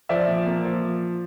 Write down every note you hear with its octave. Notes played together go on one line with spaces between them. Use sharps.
F3 D5 E5
A#2
A#3
F3